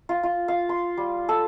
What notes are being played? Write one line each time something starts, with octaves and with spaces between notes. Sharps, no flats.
F4
F4
F5
C6
G3
A4